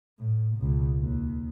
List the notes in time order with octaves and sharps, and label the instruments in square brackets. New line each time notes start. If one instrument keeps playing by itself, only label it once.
[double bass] A2
C#2 B2
D#2